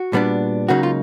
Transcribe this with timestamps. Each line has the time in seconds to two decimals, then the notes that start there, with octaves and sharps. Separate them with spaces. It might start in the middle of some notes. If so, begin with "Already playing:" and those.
Already playing: F#4
0.13 A#2 G3 B3 D4
0.69 C#2 C#3 F#3 A#3 D#4 F#4
0.83 F4